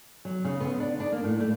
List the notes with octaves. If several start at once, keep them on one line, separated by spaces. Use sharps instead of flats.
F#3
C#3
B3
D4
D4
A#3
A2
A3